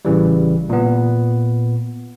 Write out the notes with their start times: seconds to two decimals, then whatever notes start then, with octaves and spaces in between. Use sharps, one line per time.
0.05 A1 C#3 E3 G3
0.69 A#2 B3